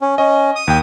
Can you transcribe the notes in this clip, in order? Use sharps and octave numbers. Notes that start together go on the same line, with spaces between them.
C#4
C#4 D#5
D#6
D#2 G5